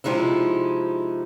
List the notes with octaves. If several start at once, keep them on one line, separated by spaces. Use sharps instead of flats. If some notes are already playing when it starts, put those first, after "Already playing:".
C3 F3 G#3 D#4 E4